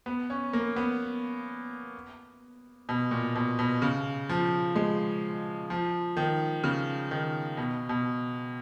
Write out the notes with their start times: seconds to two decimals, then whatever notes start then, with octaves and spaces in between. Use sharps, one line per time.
0.06 B3
0.30 C#4
0.53 A#3
0.76 B3
2.89 B2
3.11 A#2
3.35 B2
3.59 B2
3.82 C#3
4.29 F3
4.76 G#3
5.70 F3
6.17 D#3
6.64 C#3
7.11 D#3
7.57 B2
7.89 B2